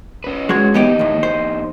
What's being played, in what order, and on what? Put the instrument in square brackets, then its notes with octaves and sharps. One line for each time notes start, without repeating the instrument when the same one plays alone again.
[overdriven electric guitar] C#4 B4
[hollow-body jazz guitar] G#3 F#4 C#5
[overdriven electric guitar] E2 D#4 [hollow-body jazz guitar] E3 B3 G4
[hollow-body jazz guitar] D#2 A2
C5